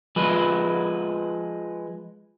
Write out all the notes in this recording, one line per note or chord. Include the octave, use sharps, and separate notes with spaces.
F3 G#3 B4